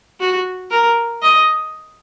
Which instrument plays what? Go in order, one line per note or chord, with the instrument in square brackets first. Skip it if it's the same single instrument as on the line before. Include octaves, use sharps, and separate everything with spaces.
[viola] F#4
A#4
D#5